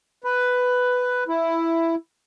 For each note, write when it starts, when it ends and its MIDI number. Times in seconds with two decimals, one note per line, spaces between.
0.24 1.24 71
1.28 1.95 64